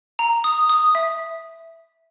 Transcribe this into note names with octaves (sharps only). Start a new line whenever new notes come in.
A#5
D#6
D#6
E5